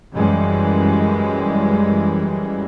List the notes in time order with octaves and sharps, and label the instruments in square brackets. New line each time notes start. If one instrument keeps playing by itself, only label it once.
[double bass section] F#2 E3 G3 G#3